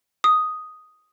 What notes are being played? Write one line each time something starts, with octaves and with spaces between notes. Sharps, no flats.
D#6